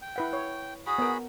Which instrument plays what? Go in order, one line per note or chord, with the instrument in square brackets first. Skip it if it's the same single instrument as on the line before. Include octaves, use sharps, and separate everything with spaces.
[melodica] G5
[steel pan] E4 B4 F#5
C#5
[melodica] F#4 G#4 B5 [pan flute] D#6
[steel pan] B3 A#4